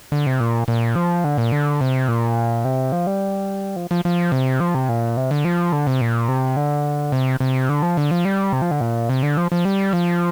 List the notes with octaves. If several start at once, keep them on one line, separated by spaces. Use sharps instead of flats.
D3
C3
A#2
A#2
F3
D3
A#2
D3
C3
A#2
C3
F3
G3
F3
F3
F3
C3
F3
C3
A#2
C3
D3
F3
D3
C3
A#2
C3
D3
C3
C3
D3
F3
D3
F3
G3
C3
F3
D3
A#2
C3
D3
F3
F3
G3
F3